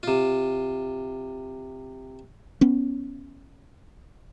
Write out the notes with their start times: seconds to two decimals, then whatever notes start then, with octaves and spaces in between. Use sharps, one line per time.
0.03 C3 F4
2.61 B3 C#4